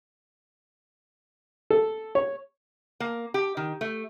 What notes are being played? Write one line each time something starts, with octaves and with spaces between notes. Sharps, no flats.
A4
C#5
A#3
G4
D#3
A3